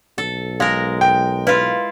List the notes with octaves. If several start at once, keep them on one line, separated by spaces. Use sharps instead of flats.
B1 A4
G#3 A#4 F5
G5
E4 F4 B4 F5